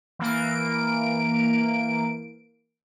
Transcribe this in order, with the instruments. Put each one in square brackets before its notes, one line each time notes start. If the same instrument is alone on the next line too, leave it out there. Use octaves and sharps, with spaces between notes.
[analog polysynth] E3 A#3 D7